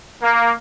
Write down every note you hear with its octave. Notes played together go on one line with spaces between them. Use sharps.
A#3